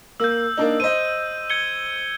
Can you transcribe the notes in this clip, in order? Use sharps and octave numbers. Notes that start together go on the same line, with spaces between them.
A#3 E6 G6
A#3 D4 D#4
C5 D#5 D#7
G#6 C#7 G7